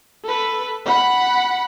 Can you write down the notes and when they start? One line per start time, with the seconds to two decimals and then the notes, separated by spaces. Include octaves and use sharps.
0.25 A4 B4
0.86 F#5 B5